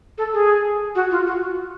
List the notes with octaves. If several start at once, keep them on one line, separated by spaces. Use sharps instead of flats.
A4
G#4
F#4
F4
F#4